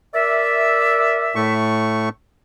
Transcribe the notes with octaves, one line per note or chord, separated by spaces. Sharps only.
A#4 D5 E5
A2 A3 C#6